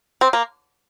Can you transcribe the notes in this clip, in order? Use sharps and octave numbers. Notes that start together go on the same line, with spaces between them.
C4
A#3